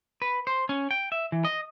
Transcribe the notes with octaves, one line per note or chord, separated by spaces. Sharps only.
B4
C5
C#4
G5
E5
E3
D#5